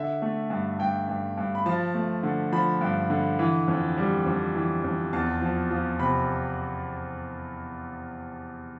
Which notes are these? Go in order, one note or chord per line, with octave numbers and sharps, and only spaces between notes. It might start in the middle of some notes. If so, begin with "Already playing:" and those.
Already playing: D3 E5
A3
G2
G2 G5
G2
G2
B5
F3 A5
A3
D3
F3 B5
G2
D3
E3
F2
G3
F2
E3
F2
E2 A5
F3
F3
C3 B5